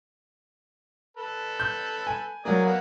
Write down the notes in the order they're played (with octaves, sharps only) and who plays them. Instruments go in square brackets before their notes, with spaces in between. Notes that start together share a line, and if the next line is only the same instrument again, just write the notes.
[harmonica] A4 B4
[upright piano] G6
G#5
[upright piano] F#3 A#3 [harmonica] D5 G#5 D#6
[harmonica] A#3 B3 F#4